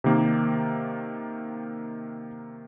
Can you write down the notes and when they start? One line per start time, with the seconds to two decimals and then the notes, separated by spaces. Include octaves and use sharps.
0.04 C3 D#3 A#3